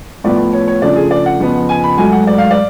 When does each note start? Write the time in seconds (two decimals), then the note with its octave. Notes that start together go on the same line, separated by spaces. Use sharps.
0.24 A2 F3 B3 D5
0.53 C#5
0.68 C#5
0.82 C#3 F3 A3 D4 D5
0.96 G#4
1.11 D5
1.26 F#5
1.40 F2 C#3 F3 B3
1.69 G#5
1.84 B5
1.97 G#2 F#3 A3 G#5
2.12 F#5
2.27 D5
2.38 F5
2.51 D5